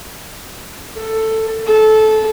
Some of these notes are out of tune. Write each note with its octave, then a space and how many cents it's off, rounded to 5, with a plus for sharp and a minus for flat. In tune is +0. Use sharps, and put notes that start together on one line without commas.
A4 +10
A4 -20